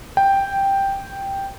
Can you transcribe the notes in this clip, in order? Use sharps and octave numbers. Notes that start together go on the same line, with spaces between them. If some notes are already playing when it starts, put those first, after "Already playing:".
G5